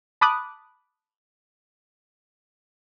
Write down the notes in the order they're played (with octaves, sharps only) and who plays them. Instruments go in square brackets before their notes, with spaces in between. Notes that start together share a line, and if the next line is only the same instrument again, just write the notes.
[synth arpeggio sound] A5 B5 D6 D#6 F#6